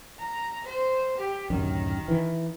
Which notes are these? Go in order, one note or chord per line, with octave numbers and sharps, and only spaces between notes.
A#5
C5
G4
D1 F#2 D#3
E3